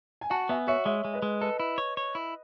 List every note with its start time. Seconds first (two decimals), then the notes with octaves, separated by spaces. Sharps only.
0.21 G#5
0.30 F#4 F#5 A5
0.49 B3 E5 G#5
0.67 F#4 C#5 E5
0.86 G#3 C#5 E5
1.05 G#3
1.14 B4 D#5
1.22 G#3
1.41 A4 B4 D#5
1.60 E4
1.78 C#5
1.97 C#5
2.15 E4